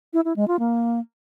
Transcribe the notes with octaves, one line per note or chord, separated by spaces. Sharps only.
E4
E4
G#3
F4
A#3